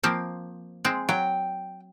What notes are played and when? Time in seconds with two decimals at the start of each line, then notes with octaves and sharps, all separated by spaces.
0.03 F3 A#3 C4
0.85 G#3 C4
1.09 F#3 G5